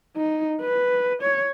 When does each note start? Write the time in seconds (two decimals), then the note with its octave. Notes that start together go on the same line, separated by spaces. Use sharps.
0.17 D#4
0.61 B4
1.22 C#5